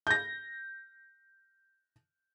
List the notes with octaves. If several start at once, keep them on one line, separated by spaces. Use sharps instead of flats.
G6 A#6